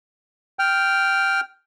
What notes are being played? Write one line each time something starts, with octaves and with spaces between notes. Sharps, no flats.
G5 F6